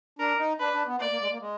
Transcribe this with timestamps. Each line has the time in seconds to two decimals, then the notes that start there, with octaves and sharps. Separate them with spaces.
0.19 D4 A#4
0.39 D#4
0.60 D4 B4
0.74 D4
0.87 B3
1.00 A#3 D5
1.11 A#3
1.20 G#3
1.31 A#3
1.41 G#3